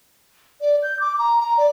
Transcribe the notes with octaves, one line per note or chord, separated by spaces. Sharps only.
D5
G6
D6
A#5
A#5
D5